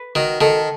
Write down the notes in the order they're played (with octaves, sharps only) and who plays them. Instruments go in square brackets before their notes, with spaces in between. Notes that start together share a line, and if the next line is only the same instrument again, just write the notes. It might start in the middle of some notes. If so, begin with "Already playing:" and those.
Already playing: [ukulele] B4
[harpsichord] D#3 [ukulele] F#4
[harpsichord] D#3 [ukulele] A4